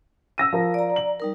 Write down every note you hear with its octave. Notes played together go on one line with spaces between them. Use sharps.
E6 A#6 D#7
F3 A#4
D5 A#5
F#7
G3 D#4 A#4